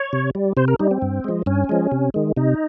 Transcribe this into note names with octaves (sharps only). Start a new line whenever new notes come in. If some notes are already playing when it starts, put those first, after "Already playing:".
Already playing: C#5
C3
G3
C3 C5
A#4
G3 D#4
C4
G2
F3 G#3
G2 C#4
F3 G#3
C3
D#3 G#3
C3 D#4